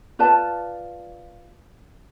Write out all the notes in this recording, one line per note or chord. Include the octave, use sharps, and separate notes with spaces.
F4 B4 D5 A5